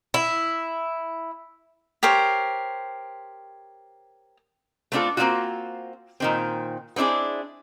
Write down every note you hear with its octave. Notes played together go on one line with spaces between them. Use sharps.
E4
G4 A#4 C5 C#5
A3 B3 C4 D4 F4 A4
A#3 C4 C#4 D#4 F4 F#4
A#2 D#3 C4
B3 C4 D4 E4 G#4